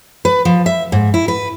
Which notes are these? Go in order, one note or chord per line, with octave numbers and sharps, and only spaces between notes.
B4
F3
E5
G#2
E4
B4